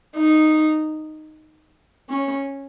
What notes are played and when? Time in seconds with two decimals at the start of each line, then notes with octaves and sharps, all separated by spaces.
0.16 D#4
2.09 C#4